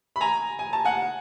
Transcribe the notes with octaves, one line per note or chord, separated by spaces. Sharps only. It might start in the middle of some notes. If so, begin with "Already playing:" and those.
B5
G#5 A#5
G#5
A5
F#5 G#5